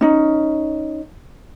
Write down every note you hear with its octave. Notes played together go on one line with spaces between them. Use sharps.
C#4 D#4